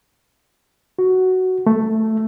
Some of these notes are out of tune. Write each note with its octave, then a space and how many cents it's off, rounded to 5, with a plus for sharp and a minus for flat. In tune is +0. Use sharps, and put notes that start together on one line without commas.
F#4 +10
A3 +5